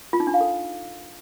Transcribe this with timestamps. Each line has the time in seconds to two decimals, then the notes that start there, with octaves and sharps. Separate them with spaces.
0.13 F4
0.20 D#4
0.27 D4
0.34 F5
0.41 A4